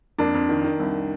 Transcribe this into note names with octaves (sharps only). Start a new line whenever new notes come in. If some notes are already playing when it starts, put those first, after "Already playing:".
F2 A#3 D4
F2
D#3
D#3
C2